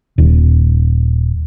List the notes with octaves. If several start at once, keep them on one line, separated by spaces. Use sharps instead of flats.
D#1